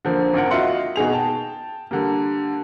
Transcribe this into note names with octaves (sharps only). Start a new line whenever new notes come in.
D3 F3 A#3
G#1 D2 A#4 F#5
F4 F#4 D#5 E5 F#5 C6
B2 D#4 G#4 F7
G5 A5
D3 G3 A#3